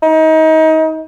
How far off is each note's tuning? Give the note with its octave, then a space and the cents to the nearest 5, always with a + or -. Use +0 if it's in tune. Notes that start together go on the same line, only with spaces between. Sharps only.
D#4 +30